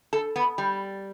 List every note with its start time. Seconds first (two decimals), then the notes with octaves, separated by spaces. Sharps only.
0.13 A4
0.36 B3
0.58 G3